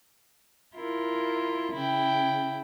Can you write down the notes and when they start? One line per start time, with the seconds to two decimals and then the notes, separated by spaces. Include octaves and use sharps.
0.75 E4 F4 A#4
1.74 C#3 E4 G5